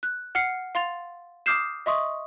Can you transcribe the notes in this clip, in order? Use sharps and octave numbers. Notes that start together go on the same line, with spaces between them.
F#6
F#5 F6 C7 C#7
F5 C6 A6 F7
D6 D#6 F6 G6 C7 E7
D#5 E5 C6 C#6 D#6